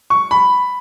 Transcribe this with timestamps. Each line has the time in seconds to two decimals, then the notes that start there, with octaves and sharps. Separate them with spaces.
0.10 C#6
0.31 B5